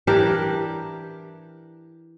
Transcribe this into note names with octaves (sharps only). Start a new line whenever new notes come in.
E3 D4 G4 A#4